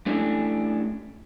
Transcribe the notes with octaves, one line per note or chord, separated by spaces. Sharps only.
A3 C#4 D4 E4 G4